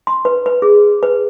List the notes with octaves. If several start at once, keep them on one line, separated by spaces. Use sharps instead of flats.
C6
B4
B4
G#4
B4